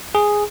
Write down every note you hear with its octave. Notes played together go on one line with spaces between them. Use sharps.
G#4